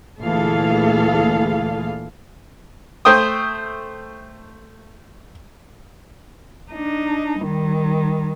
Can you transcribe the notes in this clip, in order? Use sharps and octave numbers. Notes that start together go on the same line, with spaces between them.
D2 A#2 E3 G#4 A4 F5
A3 C5 G5 D#6
D4 D#4
D#3 G3